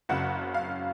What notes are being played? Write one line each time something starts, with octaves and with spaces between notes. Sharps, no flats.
F#1 F#2 C#3 F#5
F5